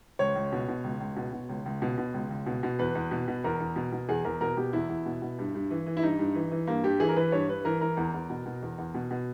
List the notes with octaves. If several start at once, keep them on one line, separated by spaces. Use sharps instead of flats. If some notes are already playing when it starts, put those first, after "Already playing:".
C#2 C#5
C#2
B2
B2
C#2
C#2
B2
B2
C#2
C#2
B2
B2
C#2
C#2
B2
B2
E2 B4
E2
B2
B2
E2 A#4
E2
B2
B2
E2 G#4
E2 A#4
B2 A#4
B2 G4
E2 E4
E2
B2
B2
G2
G2
E3
E3
E4
G2 D#4
G2
E3
E3
G2 A#3
G2 G4
E3 G#4
A#4
E3 B4
G2 C#5
G2 B4
E3 A#4
E3 A#4
E2
E2
B2
B2
E2
E2
B2
B2